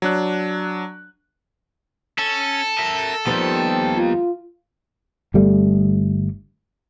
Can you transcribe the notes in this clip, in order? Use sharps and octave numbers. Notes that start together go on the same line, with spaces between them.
F#3 D4 F#6
C#4 A4
A#4 E5
D#2 D#3 F3 G3 B3
F4
G1 G3 A3